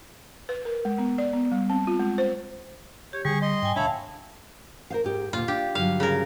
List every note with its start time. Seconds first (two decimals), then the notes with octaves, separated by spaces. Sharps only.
0.49 B4
0.65 A#4
0.85 G#3
0.98 B3
1.18 D5
1.33 B3
1.52 G3
1.70 C4
1.87 F4
1.99 G#3
2.18 C5
3.13 G4 C#5
3.25 D3 G3 G#4 C#6
3.42 D#5 C6
3.62 G#2 G5 G#5
3.76 D#1 D2 D4 C#5 E5 F5 A5 B5
4.90 A#4 C5 F5
5.04 G#2 G4
5.33 D2 A#2 F4
5.48 D4 G4
5.75 G2 D3 F#3 F5
6.00 C#3 A#4